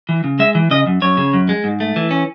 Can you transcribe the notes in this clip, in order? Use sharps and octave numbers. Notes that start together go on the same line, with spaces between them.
E3
C#3
G#3 E5
E3
C#3 D#5
F#2
F#2 C#5
C#3
F#2
G#3
G#2
A3
E3
C#4